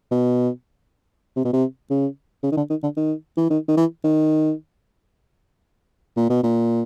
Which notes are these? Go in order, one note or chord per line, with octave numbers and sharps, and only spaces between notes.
B2
C3
B2
C3
C#3
C#3
D#3
D3
D#3
D3
D#3
E3
D#3
D#3
E3
D#3
A#2
B2
A#2